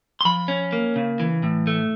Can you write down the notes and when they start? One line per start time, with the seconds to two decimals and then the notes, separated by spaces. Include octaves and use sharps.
0.21 C6
0.25 F3 B5
0.48 C#4
0.73 A#3
0.96 C#3
1.20 E3
1.43 A2
1.67 A3